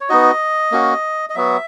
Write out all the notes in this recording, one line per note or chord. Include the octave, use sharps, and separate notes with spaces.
C#5
B3 D#4 F#4 D#5
A#3 C#4 F#4
D#5
F#3 B3 F#4 E5